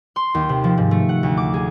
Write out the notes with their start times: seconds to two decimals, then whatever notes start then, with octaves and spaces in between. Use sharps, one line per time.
0.16 C6
0.34 D#2
0.49 C3
0.64 F3
0.77 G#2
0.91 A3
1.09 F#5
1.23 D2
1.37 D6
1.54 G#4